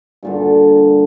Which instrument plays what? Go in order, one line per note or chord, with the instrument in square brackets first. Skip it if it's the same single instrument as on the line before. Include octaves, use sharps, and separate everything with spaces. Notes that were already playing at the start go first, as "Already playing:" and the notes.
[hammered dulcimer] G2 A#2 D3